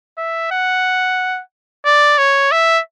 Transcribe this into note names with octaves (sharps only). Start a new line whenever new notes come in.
E5
F#5
D5
C#5
E5